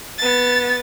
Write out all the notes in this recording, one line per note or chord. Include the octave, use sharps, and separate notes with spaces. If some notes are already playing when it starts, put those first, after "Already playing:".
B3 A6